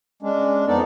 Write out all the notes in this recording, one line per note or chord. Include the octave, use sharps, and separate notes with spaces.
G#3 C#4 D4
F2 B3 D#4 A4 D5